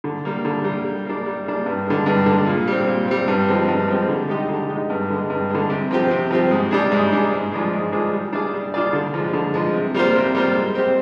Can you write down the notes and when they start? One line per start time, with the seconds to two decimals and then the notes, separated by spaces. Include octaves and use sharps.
0.04 D3
0.25 G3 A#3
0.45 D3
0.64 G3 A#3
0.85 G3
1.05 A#3 D4
1.26 G3
1.46 A#3 D4
1.66 G2
1.87 D3 G#3
2.06 G2
2.26 D3 G#3
2.46 A#2
2.67 G3 C4
2.87 A#2
3.08 G3 C4
3.28 G2
3.48 F3 G#3 C4 G4
3.68 G2
3.88 F3 G#3 C4 G4
4.09 D3
4.28 G#3 D#4 G4
4.49 D3
4.69 G#3 D#4 G4
4.90 G2
5.10 D3 G#3
5.30 G2
5.50 D3 G#3
5.70 C3
5.91 F3 C4 G4
6.11 C3
6.30 F3 C4 G4
6.51 G#2
6.71 G3 D4 G#4
6.92 G#2
7.12 G3 D4 G#4
7.32 G#2
7.52 F3 G#3 D4 G#4
7.72 G#2
7.92 F3 G#3 D4 G#4
8.13 G3
8.33 D4 F4 G#4 D5
8.53 G3
8.74 D4 F4 G#4 D5
8.93 D3
9.14 F3 G#3
9.33 D3
9.54 F3 G#3
9.74 C3
9.94 G3 A#3 F4 C5
10.15 C3
10.35 G3 A#3 F4 C5
10.56 G#3
10.75 C4 G4 C5